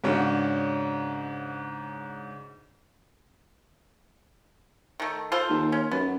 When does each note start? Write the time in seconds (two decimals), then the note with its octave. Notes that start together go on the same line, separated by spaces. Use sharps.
0.04 G#2 C#3 C#4 D4 F#4
5.00 D#3 A3
5.32 F4 A4 C5
5.50 D#2
5.72 C#4
5.91 F#2 B3